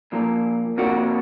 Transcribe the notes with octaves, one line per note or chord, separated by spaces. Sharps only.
A#2 F3 A#3
C3 F3 A#3 D4 F#4